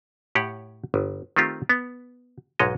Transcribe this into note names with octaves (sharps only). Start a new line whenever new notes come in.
A2 G4 C#5 F#5
G1
D#3 A3 C4 F4 G4
B3
B1 G#2 G#3 C#5 D#5